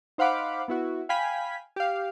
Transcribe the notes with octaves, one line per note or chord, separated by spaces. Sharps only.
D#4 C5 F5 F#5 B5 D6
B3 E4 F#4
F5 G5 G#5 B5 B6
G4 F5